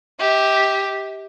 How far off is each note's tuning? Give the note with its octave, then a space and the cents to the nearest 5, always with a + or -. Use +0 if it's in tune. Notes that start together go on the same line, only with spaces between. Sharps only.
G4 +0 E5 -45